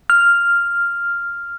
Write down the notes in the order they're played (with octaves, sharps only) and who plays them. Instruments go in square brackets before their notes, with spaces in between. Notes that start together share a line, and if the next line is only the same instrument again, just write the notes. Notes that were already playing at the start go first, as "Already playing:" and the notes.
[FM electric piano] F6